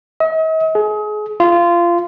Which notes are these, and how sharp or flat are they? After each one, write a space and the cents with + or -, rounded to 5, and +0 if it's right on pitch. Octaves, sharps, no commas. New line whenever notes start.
D#5 +45
G#4 +30
F4 -20